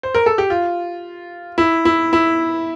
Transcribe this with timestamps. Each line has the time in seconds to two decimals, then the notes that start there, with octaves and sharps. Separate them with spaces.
0.03 C5
0.15 A#4
0.26 A4
0.38 G4
0.50 F4
1.58 E4
1.85 E4
2.13 E4